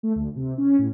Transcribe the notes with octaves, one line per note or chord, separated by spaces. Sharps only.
A3
D2
C3
C#4
A2